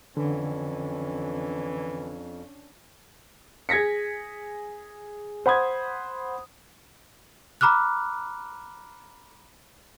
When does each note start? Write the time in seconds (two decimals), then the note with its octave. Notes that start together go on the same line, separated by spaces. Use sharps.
0.17 F2 D3 E3 C#4 D4
3.69 G#4 G#6 A#6 B6 C#7
5.46 C5 F#5 B5 D#6 G#6
7.61 A#5 B5 D6 F6 F#6